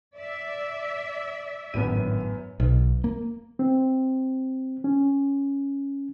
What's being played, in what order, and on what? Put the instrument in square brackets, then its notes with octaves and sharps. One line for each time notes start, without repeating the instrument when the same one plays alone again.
[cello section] D5 E5
[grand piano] G#1 A2 D3 [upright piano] F#2 B3 D#7
[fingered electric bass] B1
A#3
[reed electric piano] C4
C#4